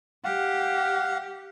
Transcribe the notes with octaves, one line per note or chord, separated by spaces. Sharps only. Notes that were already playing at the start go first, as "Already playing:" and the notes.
G4 F5 F#5